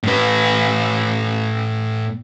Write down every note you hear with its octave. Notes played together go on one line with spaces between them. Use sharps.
A2 B4